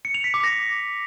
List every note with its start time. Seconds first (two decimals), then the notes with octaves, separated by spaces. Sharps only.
0.05 C#7
0.14 F7
0.24 B6
0.34 D6
0.44 A#6